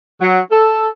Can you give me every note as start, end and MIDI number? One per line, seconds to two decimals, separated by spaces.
0.20 0.38 54
0.50 0.86 69